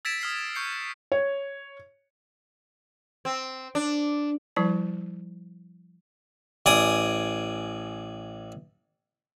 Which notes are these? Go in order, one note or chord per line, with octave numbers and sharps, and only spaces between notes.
E6 G#6 A6 B6 D7 E7
D#6 F6 C7
C#6 G6 C7 C#7
C#5
C4
D4
F3 G3 E4 D5 A5
A1 D5 G#5 D#6